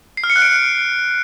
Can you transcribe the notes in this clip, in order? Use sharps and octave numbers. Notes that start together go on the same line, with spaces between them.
C7
F6
C#7
F#6
D7